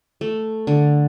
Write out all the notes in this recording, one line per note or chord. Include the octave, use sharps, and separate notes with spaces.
A3
D3